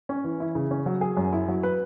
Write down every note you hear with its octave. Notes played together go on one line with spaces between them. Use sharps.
C#4
E3
E4
C#3
C#4
F#3
G#4
F#2
E4
F#3
B4